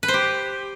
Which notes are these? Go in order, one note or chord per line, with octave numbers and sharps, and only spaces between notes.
B4
C5
G4